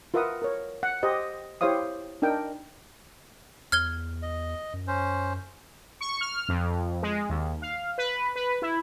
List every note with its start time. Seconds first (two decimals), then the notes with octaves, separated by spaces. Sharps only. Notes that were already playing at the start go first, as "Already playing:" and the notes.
0.14 F4 A#4 B4 E5 F#5 D#6
0.42 A#4 C#5
0.83 F#5
1.03 G4 C5 D#5
1.61 E4 G4 C5 C#5 F5 D#6
2.22 D4 D#4 A#4 G5
3.72 E2 F6 G#6 G7
4.22 D#5
4.73 F#2
4.87 C#4 C5
6.01 C#6
6.21 F6
6.49 F2
7.03 G#3
7.29 D#2
7.62 F5
7.98 B4
8.36 B4
8.62 E4